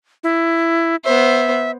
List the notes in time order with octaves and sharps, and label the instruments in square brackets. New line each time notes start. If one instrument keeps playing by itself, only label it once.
[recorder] E4
[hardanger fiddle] B3 C5 [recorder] E5